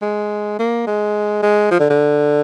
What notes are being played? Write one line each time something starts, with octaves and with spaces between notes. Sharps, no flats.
G#3
A#3
G#3
G#3
F3
D3
D3